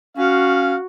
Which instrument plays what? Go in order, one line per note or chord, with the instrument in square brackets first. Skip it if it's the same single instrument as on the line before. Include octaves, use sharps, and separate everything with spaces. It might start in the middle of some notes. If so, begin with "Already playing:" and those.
[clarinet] C#4 [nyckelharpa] F#4 [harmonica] F5